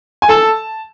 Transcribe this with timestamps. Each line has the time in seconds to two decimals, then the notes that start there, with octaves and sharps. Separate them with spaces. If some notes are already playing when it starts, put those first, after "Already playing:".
0.22 G#5
0.29 A4 A5